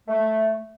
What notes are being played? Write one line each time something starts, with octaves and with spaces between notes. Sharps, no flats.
A3